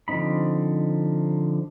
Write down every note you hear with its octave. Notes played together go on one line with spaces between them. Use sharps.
D3 F3 C4 D#4 B5